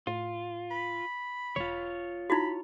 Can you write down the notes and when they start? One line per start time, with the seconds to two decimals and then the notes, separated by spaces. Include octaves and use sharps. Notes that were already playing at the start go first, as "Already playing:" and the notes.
0.07 A2 F4
0.71 B5
1.56 E1 F4 C#5
2.30 D#4 E4 F#4 B5